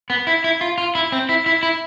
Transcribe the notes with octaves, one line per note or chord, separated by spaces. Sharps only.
B3
E4
E4
F4
F4
E4
C4
E4
E4
E4